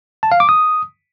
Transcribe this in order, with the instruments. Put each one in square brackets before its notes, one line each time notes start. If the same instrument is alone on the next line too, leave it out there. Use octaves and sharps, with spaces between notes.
[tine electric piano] A5
F5
D6
D#6